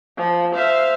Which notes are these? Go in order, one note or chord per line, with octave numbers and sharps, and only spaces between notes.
F3
C5 E5 F5